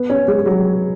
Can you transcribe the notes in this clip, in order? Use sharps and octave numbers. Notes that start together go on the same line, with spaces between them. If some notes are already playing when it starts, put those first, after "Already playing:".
Already playing: B3 B4
C#4 C#5
G#3 G#4
G#4
F#3 F#4